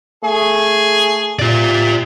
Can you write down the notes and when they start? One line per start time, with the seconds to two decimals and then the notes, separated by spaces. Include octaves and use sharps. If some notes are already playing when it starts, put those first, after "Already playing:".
0.24 A3 G#4
1.39 C3 F4 D5